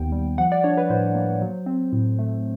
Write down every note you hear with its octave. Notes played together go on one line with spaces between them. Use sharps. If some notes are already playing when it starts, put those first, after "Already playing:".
Already playing: D#2 D#3 B3 G5
G3
F3 F#5
D5
D4 C#5
B4
A2 C5
A#3
F#3
C4
A2
A3